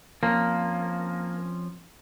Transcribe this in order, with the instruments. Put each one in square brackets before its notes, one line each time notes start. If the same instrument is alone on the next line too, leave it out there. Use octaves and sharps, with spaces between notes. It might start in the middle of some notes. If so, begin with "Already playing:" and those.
[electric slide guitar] F3 C4 C#4 [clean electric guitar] A#3